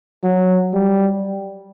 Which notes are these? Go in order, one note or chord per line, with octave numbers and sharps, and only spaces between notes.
F#3
G3